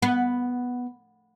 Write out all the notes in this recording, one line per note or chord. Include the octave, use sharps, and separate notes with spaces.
B3